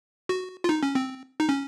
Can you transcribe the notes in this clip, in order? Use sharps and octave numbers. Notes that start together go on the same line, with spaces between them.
F#4
F4
D#4
C#4
C4
D#4
C#4